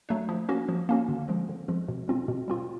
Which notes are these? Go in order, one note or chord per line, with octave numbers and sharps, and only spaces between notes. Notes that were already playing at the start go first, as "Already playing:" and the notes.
F#3 A3 D4
F3
A#3 C#4 F#4
F3
A#3 C#4 F#4
D3
F3 G#3 C4
D3
F3 G#3 C4
B2
G3 C4 F4
B2
G3 C4 F4